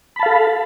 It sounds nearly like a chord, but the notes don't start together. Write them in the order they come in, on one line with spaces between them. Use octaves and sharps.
B5 A5 F5 A4